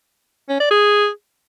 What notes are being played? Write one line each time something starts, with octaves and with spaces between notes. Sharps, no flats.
C#4
D5
G#4